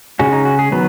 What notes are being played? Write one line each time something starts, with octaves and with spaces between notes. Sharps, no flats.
C#3 G#3 C#4 F#4
D#4
F#4
G#4
D#3 F#3 B3 B4